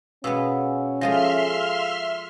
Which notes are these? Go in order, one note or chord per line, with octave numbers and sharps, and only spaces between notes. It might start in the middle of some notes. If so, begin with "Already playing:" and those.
B2 G#3 B3 C#4 F5 E6
F3 G#3 A4 E5 F5 C6 F6 A#6